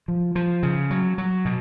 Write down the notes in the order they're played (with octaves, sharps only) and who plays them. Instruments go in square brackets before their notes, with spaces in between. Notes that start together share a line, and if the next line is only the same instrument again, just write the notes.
[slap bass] F3
F3
C#3
F#3
F#3
B2